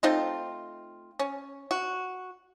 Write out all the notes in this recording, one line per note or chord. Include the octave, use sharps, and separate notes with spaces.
A3 C4 D#4 F4
C#4
F#4